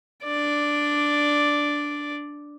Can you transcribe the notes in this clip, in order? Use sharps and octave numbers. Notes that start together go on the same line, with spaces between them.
D4 D5